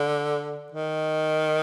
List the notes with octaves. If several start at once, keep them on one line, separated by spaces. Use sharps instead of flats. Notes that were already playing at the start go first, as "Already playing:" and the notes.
Already playing: D3
D#3